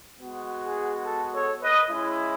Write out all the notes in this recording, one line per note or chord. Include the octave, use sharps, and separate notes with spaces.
G#3 B3 F#4
G#4
A4
A4 C#5
B4 D#5
G#3 C#4 E4